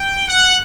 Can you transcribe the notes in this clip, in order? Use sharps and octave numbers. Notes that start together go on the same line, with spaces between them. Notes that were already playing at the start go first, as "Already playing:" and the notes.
Already playing: G5
F#5